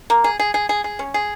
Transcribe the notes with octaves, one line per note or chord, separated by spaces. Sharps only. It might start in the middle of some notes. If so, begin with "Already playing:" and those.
A#3
G#4
G#4
G#4
G#4
G#4
C#4
G#4